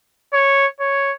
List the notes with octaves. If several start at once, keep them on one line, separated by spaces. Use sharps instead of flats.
C#5
C#5